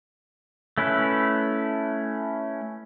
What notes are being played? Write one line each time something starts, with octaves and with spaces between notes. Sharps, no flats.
A3 C#4 E4 B4